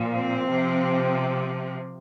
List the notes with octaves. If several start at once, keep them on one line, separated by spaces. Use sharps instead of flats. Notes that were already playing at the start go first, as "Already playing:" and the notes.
Already playing: A#2 F3
C4
C3 F3